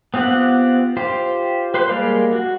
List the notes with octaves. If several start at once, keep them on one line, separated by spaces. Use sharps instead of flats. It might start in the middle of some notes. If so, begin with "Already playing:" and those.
B3 C4 F4 G4 F#5
F4 G4 C5
B4 C5 C6
G3 G#3 A#3 D5 F5
F#4